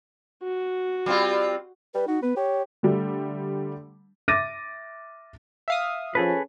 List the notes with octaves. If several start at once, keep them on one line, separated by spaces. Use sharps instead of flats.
F#4
G3 C4 F4
G3 B4
D#4 F#4
B3 B4
G4 C#5
D3 G3 A3
E5 D6 A6 A#6 D#7
E5 F5 D#6
F3 C#4 G#4 A4 B4